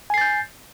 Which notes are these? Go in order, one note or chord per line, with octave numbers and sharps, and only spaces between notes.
G#5 G6 A6 C7